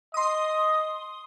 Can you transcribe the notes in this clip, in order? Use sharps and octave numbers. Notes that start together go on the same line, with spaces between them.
D#5 C6 D#6